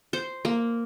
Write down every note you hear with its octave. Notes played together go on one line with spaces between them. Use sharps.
C5
A#3